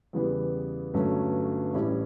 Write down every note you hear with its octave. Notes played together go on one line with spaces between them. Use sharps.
E2 C#3 E3 G3 B3
G1 G2 F#3 A3 C#4
A1 A2 G3 C#4 E4